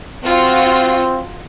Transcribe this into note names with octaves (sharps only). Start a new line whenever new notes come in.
C4 F4 F#4